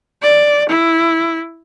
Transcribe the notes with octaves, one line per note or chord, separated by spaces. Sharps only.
D5
E4